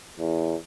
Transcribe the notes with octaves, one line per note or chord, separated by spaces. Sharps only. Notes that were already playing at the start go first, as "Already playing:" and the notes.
E2